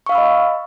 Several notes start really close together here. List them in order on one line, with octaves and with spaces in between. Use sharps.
C#6 F5 E6 B5 D#5